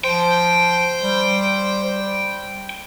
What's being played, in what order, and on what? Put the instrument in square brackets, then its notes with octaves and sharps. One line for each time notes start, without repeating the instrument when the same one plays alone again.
[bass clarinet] F3 [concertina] C5 [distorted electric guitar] G5
[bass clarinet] G3